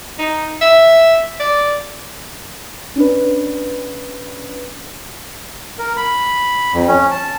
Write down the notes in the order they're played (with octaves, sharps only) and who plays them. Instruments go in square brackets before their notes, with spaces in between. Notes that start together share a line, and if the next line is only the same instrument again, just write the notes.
[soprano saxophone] D#4
E5
D5
[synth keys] C#4 D4 B4
[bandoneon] A#4
B5
F2
C#4
A5